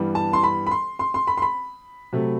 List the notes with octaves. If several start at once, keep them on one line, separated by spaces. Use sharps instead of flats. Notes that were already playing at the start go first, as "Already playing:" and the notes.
Already playing: G2 E3 G3 B3
A5
C6
B5
B5
C6
C6
C6
B5
C6
B5
C3 F#3 A3